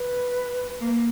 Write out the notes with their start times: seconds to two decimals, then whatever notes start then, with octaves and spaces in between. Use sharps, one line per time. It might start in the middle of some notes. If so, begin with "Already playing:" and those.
Already playing: B4
0.81 A#3